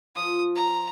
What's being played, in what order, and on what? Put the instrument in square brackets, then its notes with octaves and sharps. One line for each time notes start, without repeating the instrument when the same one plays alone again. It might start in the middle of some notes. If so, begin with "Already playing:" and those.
[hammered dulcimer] F3 [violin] D#6
[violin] A#5